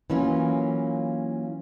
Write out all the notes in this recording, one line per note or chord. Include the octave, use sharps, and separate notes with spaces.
E3 F#3 A#3 C#4 F4